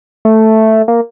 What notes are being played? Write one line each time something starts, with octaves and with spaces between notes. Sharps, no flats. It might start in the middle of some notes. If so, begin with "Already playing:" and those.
A3
A#3